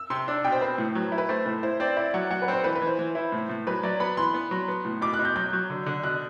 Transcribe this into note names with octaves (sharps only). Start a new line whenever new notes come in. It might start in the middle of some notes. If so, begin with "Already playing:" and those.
Already playing: E6
C3 C6
D4
B2 G5
C5
C4 B4
A2
F#3
E4
B4
A3 C5
A2 B4
E4 C5
C4 D5
E4 D5
F#3 F#5
F#3 F#5
B4
C4
C5
E3 B4
B4
E3
C5
E3
E4
A2
A2
F#3 B4
F#3 D5
B3 B5
E3 C6
B3
F#3
B3
A2
B2 D6
F#6
B2
G6
F#3 G6
F#3
D3
D3
B2 F#6